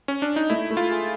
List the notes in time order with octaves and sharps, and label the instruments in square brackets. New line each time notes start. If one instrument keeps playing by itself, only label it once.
[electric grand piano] C#4
D4
D#4
[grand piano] A3 [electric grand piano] E4
[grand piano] A3
[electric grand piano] F4
[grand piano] G#4